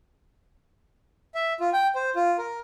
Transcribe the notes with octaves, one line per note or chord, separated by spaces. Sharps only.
E5
F4
G5
C5
F4
A#4